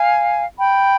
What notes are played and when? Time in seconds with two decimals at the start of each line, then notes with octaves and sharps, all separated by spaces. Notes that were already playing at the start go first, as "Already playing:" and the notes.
Already playing: F5 G#5
0.58 G5 B5